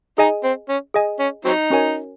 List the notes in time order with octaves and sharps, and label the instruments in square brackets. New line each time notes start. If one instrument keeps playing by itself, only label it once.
[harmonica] D#4 [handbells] G#4 D#5 G#5
[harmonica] C4
C#4
[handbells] G#4 D#5 G#5
[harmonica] C#4
F#3 C4 D#4
[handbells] C#4 F#4 A#4 C#5 G#5